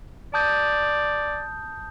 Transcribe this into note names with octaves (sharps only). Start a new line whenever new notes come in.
D5 A5 D#6 G6